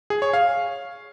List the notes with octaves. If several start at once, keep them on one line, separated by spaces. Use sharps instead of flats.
G#4
C#5
F5